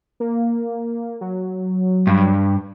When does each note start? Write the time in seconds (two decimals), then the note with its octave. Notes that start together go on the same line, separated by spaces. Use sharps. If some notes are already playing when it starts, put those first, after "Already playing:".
0.20 A#3
1.21 F#3
2.07 G2